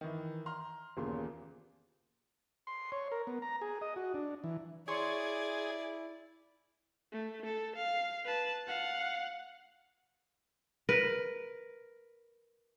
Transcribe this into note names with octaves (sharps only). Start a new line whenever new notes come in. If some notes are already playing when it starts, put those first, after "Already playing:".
D#3 E3
A#5 C6 F6
D#1 E2 A#2 C#3 A#4 C6
C6
C#5
A#4
B3
A#5
G#4
D#5
F#4
D4
E3
E4 G#4 C#5 D5 C6 C#6
A3
A4
F5
B4 A5
F5 F#5
A#4 B4